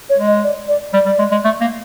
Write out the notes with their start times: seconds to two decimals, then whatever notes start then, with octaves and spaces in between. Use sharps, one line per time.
0.10 C#5
0.18 G#3
0.27 D#5
0.43 D5
0.68 D5
0.93 G3 D5
1.06 G3
1.19 G#3
1.31 G#3
1.44 A3
1.61 A#3